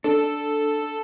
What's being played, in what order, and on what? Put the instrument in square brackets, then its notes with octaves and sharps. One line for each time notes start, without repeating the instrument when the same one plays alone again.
[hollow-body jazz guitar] D4 [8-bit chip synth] A4